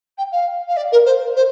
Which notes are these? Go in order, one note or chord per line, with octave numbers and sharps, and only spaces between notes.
G5
F5
F5
D5
A#4
C5
C5